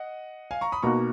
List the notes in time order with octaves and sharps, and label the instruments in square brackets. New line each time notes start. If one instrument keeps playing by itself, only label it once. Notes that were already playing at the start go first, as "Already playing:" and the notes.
Already playing: [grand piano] D#5 F#5
F5 G#5
A#5 C#6
B5 D#6
[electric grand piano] B2 A#3 D#4 F#4 [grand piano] A#5 C#6